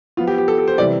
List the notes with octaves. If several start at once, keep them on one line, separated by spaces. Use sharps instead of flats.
F3 B3 F4
G4
G4
A4
A4
C5
C3 E3 G3 D5